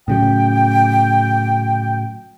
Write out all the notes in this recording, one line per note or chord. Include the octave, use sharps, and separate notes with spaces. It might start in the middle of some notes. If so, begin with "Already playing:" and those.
A2 C#3 F#3 G5